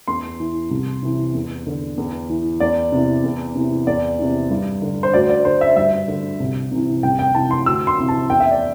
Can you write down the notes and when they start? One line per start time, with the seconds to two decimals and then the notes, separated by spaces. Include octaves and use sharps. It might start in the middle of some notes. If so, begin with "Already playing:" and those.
0.08 E2 C6
0.40 E3
0.71 C2
1.03 C3 E3
1.35 E2
1.67 D3
1.98 E2
2.29 E3
2.60 E2 D5
2.92 C3 E3
3.24 E2
3.55 C3 E3
3.87 E2 D5
4.19 C3 E3
4.51 G2
4.82 D3
5.03 C5
5.14 D2 D5
5.30 D5
5.45 D3 C5
5.61 E5
5.77 G2 E5
6.08 D3
6.40 C2
6.71 C3 E3
7.03 C2 G5
7.19 G5
7.35 C3 E3 A5
7.51 C6
7.66 D2 E6
7.87 C6
7.98 C3 E3
8.09 A5
8.30 E2 G5
8.40 E5
8.51 D5